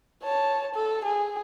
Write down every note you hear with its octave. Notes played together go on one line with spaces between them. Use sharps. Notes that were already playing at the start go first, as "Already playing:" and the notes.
C#5 A5
A4
G#4